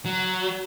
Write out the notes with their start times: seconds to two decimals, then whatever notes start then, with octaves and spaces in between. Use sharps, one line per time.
0.05 F#3